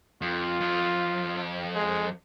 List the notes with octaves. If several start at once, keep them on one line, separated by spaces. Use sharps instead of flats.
F2 F4
F2
G#3